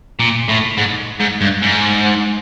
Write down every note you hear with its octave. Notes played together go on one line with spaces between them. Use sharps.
A#2
A2
G#2
G#2
G2
G#2